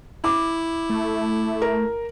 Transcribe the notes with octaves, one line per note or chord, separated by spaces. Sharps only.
E4 D6
A3
A#4